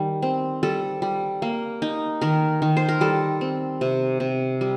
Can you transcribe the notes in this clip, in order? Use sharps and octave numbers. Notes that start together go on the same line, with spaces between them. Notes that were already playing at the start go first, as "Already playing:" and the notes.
Already playing: D#3 G3
C4
G3 A4
G3
A#3
D#4
D#3 A#4
D#3
C5
A#4
G3 A4
C4
C3
C3
G3